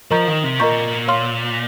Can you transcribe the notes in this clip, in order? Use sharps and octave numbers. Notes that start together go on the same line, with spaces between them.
F3 A#4 D#5 A#5 C#6 G6
D#3
C3
A#2 A#4 D#5 A#5 C#6 G6
C#5 F5 C6 F6